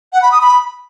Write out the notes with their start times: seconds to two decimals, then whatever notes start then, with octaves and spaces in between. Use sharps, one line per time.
0.13 F#5
0.22 B5
0.32 D#6
0.41 B5